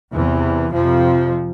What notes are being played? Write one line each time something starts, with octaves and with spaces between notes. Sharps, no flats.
E2 C3 E3
F2 C3 F3